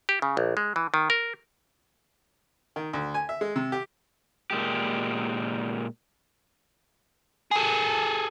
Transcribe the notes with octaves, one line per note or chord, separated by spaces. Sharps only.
G4
C#3
A#1
G#3
E3
D#3
A#4
D#3
D2
G#5
E5
G#3
C3
G4
A#2 G#3 G4
G#4 A4